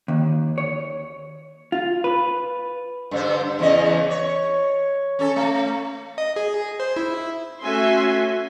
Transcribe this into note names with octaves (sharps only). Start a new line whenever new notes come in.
D#2
C#5
F4
B4
G2 D3 C5
E2 C#3 D#5
C#5
C#4 A4
A3
D#5
G#4
C5
E4
A3 C#4 F#4 E5 G#5 C6